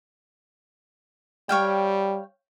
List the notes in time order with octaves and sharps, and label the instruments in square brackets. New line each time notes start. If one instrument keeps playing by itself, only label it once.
[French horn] G3 [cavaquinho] C#5 F5 G5